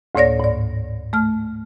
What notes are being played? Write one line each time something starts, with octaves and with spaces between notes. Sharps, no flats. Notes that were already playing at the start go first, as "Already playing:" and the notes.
D2 A2 A#3 C#5 D5 A#6
G#2 D5
A3 F6